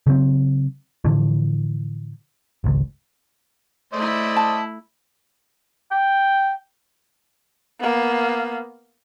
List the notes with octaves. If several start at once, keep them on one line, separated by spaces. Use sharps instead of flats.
C#3 F#3 C4
A2 D3 E3 F3
G#1 C#2
A3 E4 C5 D5 D#5
A5
G5
A#3 B3